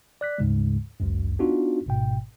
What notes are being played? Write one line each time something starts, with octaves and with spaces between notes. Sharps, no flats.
D5 F#6 B6
D2 G#2 C#3 G#3
G#1 C#2 F#2
B3 D4 D#4 F4 F#4
G#1 G#2 B2 G5